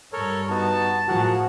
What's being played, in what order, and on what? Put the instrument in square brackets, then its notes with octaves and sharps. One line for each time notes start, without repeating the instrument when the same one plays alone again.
[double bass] G2 G3 [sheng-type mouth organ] A4 A#4 C#5
[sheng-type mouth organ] B3 D#4 F#4 [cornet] A5
[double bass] A2 F3 [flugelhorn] F#4 [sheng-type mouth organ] G#4 A#4 F#5